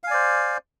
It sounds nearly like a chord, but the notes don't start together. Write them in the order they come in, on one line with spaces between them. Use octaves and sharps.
F5 G#5 D5 C5